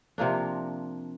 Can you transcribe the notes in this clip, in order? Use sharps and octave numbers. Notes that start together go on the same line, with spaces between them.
C3 F3 A#3 D4